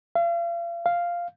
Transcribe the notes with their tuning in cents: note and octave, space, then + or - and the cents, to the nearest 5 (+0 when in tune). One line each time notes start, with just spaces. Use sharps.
F5 -40
F5 -5